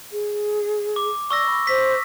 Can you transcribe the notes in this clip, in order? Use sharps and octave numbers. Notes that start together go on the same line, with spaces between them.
G#4
D6
D5 C#6 E6 A#6
B5
C5 B6